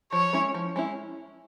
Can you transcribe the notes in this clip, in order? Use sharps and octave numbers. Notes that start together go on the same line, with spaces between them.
F3 C#5
G#3 C#4 E4
F3
G#3 C#4 E4